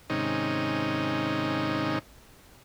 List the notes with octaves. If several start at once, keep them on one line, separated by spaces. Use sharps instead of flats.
G#2 C3 D#3 C#4 D#4